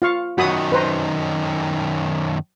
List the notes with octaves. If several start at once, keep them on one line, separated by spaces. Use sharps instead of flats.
F4 F5 C#6
F#2 D#3 F#4 B5 D#6
B4 C5 A#5